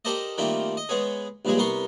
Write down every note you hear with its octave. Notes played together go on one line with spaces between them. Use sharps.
G4 A4 A#4 C5 D5 D#5
D#3 G3 A3 A#3 C4 F4
D#5
G#3 B3 C#4 G#4
A#1 G2 C#3 G#3 G#4
C2 B3 A#4 C6 C#6